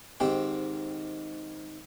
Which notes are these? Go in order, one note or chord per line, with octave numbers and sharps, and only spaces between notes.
G#2 D#3 C4 G4 B5